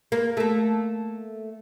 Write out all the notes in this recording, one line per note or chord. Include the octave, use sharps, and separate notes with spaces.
A#3
A3 A#3